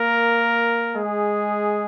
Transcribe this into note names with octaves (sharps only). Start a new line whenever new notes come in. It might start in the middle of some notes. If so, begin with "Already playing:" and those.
Already playing: A#3 A#4
G#3 G#4